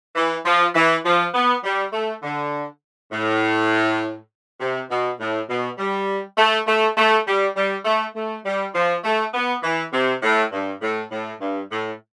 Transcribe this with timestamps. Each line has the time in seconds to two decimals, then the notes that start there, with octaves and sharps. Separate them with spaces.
0.16 E3
0.45 F3
0.75 E3
1.05 F3
1.34 B3
1.64 G3
1.93 A3
2.23 D3
3.12 A2
4.60 C3
4.90 B2
5.20 A2
5.49 B2
5.78 G3
6.38 A3
6.67 A3
6.97 A3
7.27 G3
7.56 G3
7.85 A3
8.15 A3
8.45 G3
8.75 F3
9.04 A3
9.34 B3
9.63 E3
9.93 C3
10.23 A2
10.52 G2
10.82 A2
11.11 A2
11.41 G2
11.71 A2